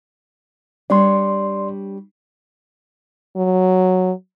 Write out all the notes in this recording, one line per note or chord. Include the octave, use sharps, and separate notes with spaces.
G3 D4 C#5 D5 C6
F#3